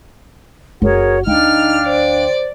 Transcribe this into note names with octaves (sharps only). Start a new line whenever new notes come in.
F#1 F#4 G#4 A#4 C#5
D2 D4 D#4 F5 G5 F6
C5 D5